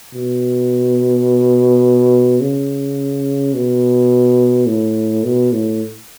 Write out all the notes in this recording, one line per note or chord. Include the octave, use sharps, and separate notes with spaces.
B2
C#3
B2
A2
B2
A2